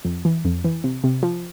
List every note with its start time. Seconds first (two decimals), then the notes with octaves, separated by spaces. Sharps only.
0.05 F2
0.25 E3
0.45 F2
0.64 E3
0.84 C3
1.04 C3
1.23 F3